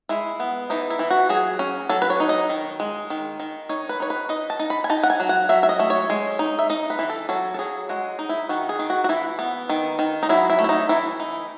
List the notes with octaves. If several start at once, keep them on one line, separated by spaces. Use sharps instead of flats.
G#3 E4
B3
E3 D#4
E4
E3
F#4
F#3 G#4
C#4
F#3 A4
B4
C#5
D#4
D#5
D#3
G#3
D#3
D#3
D#4 C#5
B4
D#4 C#5
B4
D#4 D#5
A5
D#4
B5
G#5
D#4 A5
F#5
G#5
F#3
F#5
F#3 E5
E5
D#5
A3
C#5
G#3
D#4
E5
D#4 D#5
B4
E3
A4
F#3 A4
A4
F#3 G#4
G#3 F#4
D#4
E4
D#3 F#4
G#4
D#3
F#4
F#4
E3 E4
B3
D#3
D#3
D#4
F#3 E4
E4
A3
E4
D#4
E3 E4
D#4